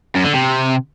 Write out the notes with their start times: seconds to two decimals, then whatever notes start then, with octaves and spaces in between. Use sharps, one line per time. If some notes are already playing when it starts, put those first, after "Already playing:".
0.15 F#2
0.25 D3
0.34 C3